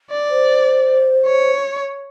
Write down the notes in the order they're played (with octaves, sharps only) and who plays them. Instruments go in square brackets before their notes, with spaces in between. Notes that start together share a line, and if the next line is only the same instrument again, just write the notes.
[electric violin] D5
[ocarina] C5
[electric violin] C#5